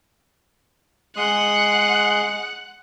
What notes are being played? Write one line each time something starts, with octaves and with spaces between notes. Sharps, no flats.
G#3 F#5 C6 D#6